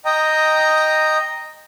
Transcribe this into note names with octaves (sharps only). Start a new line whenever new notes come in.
D#5 G5 A#5 D#6